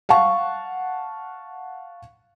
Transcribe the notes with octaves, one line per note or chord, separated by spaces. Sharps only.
F5 F#5 A5 C#6